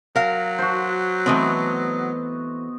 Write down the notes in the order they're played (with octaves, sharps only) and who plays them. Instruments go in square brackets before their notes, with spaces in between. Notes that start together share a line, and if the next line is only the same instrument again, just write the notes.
[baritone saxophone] F#3 [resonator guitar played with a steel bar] A#4 F5
[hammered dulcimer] F#4 C5
[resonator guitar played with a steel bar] E3 A3 C4 [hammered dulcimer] B3 D#5